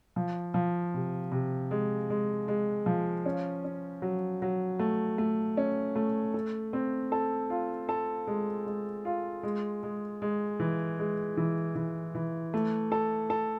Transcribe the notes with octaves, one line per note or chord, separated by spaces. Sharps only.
F3
F3
C3
C3
G#3
G#3
G#3
F3
C#4
C#4
F#3
F#3
A3
A3
C#4
A3
A4
C4
A4
F4
A4
G#3
G#3
F4
G#3
G#3
G#3
E3
G#3
E3
E3
E3
A3
A4
A4